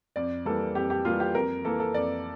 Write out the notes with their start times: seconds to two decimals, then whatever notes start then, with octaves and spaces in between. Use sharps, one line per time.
0.16 F2 D5
0.45 E3 G3 A#3 A4
0.75 F2 G4
0.90 G4
1.05 E3 G3 A#3 F4
1.20 G4
1.35 F2 A#4
1.65 E3 A#3 A4
1.80 A4
1.94 F2 D5